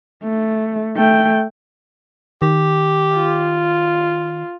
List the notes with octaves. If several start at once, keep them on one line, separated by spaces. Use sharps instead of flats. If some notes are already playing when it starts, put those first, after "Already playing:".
A3
A3 G5
D#3 G4
F4